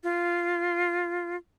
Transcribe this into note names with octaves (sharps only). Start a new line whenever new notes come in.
F4